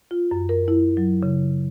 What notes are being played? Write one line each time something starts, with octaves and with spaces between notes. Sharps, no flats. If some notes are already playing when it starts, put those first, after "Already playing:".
F4
F#2
A#4
E4
F#3
C#3